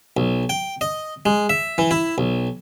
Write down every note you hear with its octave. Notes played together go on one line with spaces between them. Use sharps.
B1
G5
D#5
G#3
E5
E3
E4
B1